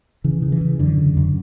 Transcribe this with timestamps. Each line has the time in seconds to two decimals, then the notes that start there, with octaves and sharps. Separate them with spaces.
0.24 C#3 E3
0.42 C#3
0.52 E3
0.61 C#3
0.79 F#2 D3
0.98 C#3
1.17 F#2